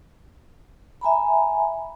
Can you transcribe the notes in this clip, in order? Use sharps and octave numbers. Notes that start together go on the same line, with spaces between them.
E5 G#5 A#5 B5